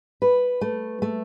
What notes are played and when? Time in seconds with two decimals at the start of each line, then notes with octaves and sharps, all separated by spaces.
0.22 B4
0.61 A3
1.02 A3